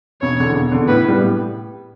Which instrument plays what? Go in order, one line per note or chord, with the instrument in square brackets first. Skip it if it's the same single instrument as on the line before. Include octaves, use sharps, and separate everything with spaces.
[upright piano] E1 [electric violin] C#5
[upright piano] E2 D3
E1
E2 D3
[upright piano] A2 [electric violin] B4
[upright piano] G3 B3
A2